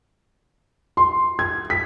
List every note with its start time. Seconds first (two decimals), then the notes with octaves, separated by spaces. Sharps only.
0.97 C6
1.39 G#6
1.70 B6